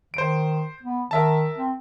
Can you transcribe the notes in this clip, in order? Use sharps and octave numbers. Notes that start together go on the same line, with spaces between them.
D#3 C5 D7
B3
D#3 A#4 E5 A5
C4